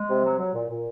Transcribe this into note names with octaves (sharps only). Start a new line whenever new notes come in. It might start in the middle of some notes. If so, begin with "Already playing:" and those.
Already playing: G#3
C3
F#3
F#3
A#2
A#2